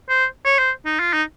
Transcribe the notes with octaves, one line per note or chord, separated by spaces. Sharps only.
C5
C#5
C5
D#4
F4
D#4